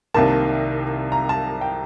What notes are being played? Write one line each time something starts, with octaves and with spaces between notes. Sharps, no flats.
C2 C3 D#3 A#3 A5
A#5
A5
G5